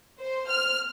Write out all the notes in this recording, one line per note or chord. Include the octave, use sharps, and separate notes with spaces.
C5
F6